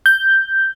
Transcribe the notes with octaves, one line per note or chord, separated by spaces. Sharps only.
G6